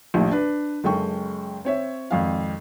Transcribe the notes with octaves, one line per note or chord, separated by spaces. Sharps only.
A#1 D#2 A2 F3
D4 B4
F#1 G#3 A4 G5 C#6
C4 C#5 E5
G#1 F2 F5